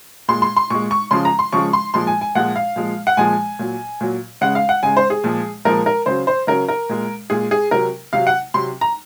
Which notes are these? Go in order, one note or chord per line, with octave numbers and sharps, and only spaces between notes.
A#2 G#3 C6
C6
C6
A#2 G#3 C#6
C#6
C#3 F3 G#3 C6
A#5
C6
C#3 F3 G#3 C#6
C6
A#2 F3 G#3 C6
G#5
G#5
A#2 F3 G#3 F#5
F5
A#2 F3 G#3
F#5
A#2 F3 G#3 G#5
A#2 F#3
A#2 F#3
C#3 G#3 F#5
F5
F#5
C#3 G#3 G#5
C5
G#4
A#2 F3 G#3
A#2 F3 G#3 A#4
A#4
C#3 F#3 C5
C5
C#3 F#3 A#4
A#4
A#2 G#3
A#2 G#3 G#4
G#4
C3 F#3 A#4
C3 F#3 F5
F#5
C3 F#3 C6
A#5